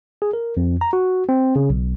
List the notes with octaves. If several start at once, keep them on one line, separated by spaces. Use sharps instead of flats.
G#4
A#4
F2
A#5
F#4
C4
C#3
B1